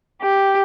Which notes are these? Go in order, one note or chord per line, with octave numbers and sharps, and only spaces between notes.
G4